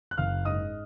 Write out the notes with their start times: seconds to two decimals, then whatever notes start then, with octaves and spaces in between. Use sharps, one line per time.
0.11 F#6
0.18 F#1 F5 F6
0.45 G#2 D#5 D#6